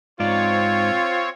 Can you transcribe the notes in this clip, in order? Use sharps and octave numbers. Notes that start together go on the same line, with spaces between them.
G#2 C4 F4 C#5 D5